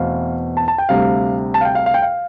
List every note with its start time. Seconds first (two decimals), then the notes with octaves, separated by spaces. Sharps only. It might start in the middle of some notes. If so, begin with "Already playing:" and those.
Already playing: E2 B2 A3 C4 F5
0.57 A5
0.68 A5
0.78 G5
0.89 D2 C3 G3 F5
1.54 A5
1.61 F5
1.65 G5
1.75 F5
1.86 F5
1.94 G5
2.02 F5